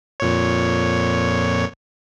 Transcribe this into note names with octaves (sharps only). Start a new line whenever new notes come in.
F2 A#2 C#5